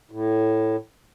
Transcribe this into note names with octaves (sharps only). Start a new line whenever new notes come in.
A2